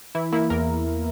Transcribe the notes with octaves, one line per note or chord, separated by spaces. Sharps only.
E3 E4
A#3 E4
E2 A#4